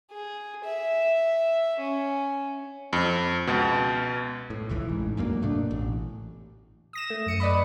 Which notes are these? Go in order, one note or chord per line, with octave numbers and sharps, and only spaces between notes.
G#4
E5
C#4
F2
C#2 B2
A2
F1 B1 E3
A1 G#2
C#2 G2 F#3 A#3
F1 B2 A3 D4
A1
D#6 A#6 E7
A3
F#2 C#7 D#7
B4 D5 D#5 B5